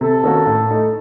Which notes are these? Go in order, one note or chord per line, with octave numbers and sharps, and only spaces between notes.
C3 A4
D#3 A#3 C#4 F#4
A2
A3 D#4 A4